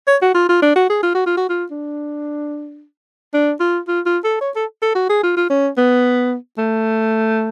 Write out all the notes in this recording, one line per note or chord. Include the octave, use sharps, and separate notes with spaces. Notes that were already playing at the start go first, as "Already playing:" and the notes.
C#5
F#4
F4
F4
D4
F#4
G#4
F4
F#4
F4
F#4
F4
D4
D4
F4
F4
F4
A4
C#5
A4
A4
F#4
G#4
F4
F4
C#4
B3
A3